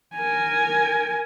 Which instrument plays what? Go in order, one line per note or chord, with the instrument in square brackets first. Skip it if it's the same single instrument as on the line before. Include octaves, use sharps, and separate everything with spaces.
[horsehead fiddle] A#4 G#5